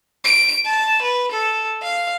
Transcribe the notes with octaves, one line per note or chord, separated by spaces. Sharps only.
D7
A5
B4
A4
F5